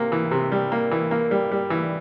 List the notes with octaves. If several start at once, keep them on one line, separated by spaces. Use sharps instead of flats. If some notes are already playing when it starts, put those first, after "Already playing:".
Already playing: C3 A#3
E3
C3
G3
A#3
E3
A#3
G3
G3
E3